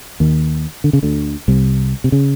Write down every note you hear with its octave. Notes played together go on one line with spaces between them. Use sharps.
D#2 D#3
D3
C#3
D2 D3
C2 C3
C3
C#3